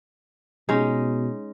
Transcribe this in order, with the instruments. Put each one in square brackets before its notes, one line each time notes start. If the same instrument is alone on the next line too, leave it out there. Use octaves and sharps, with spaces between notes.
[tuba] B2 [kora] G#3 C#4 D#4